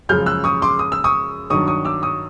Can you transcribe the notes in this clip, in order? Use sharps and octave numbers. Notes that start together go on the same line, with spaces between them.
F#2 C#3 F3 G#3 F6 G6
E6 F#6
C#6 D#6
C6 D6
D#6
E6
C#6 D#6
G2 D#3 F#3 C#6 D#6
C#6 D#6
D6 E6
C#6 D#6